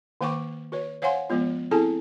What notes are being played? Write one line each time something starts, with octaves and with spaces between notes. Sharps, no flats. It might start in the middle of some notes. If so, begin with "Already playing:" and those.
D#3 A#3 C5 G5 C#6 D6
F#4 B4 C#5
C5 C#5 F5 F#5 G#5 C6
F3 G#3 B3 F4
C4 E4 G#4 A4 G#5 A5